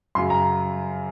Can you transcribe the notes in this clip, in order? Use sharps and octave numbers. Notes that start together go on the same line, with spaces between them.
F#2 C#3 F#3 C6
A#5